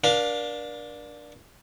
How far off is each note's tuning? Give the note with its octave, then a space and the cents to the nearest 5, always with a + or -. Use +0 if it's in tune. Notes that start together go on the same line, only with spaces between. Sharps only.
D4 +0 A#4 +40 F5 +25